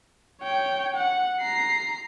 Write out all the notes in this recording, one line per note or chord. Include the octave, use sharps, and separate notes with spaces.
C#5 G5
F#5
A#5 C7